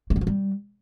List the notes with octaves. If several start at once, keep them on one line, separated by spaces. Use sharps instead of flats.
A3
G3
F3
G3